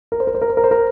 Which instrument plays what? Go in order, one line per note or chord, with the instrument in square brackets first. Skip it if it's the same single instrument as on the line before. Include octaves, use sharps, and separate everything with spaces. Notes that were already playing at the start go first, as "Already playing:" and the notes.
[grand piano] A#4
C5
A#4
C5
A#4
C5
A#4
C5
A#4